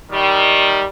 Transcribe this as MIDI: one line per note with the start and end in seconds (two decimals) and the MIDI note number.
0.10 0.83 51
0.10 0.83 55